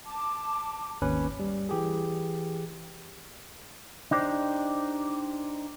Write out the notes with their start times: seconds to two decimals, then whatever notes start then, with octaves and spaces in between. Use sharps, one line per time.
0.06 A5 D6
1.02 G#1 D#2 C#4 B4
1.40 G3
1.69 E3 G4 G#4
4.11 D4 D#4 G4 C5 D5